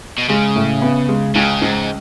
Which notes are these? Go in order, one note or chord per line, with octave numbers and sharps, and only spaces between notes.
B2
C#3 G#3
A2
B3
G#3
C#2 C#3
C#2 G#2